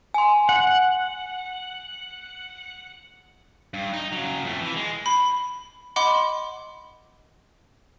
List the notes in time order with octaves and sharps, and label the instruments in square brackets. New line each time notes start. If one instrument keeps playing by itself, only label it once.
[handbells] G#5 C6
[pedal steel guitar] F#5
[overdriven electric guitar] G2
D#4
C#3 F#3
F2 A3
E3
G#3
[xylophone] B5
D#5 F#5 B5 C6 D6